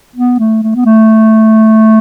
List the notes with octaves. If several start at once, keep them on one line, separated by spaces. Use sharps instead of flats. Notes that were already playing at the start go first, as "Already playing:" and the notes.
B3
A3
A3
B3
A3